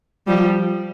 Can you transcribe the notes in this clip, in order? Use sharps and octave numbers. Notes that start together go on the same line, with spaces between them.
F3 G3